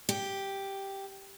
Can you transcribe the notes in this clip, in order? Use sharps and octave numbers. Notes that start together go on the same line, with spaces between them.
G4